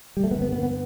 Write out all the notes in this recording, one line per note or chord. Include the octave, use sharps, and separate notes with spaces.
G3
A3
F#2 B3
G1
B3
B3
B3